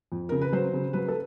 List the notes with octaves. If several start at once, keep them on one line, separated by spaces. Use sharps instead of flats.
F2
C#3 A#4
B4
F#3 C5
C#3
F#3 B4
A4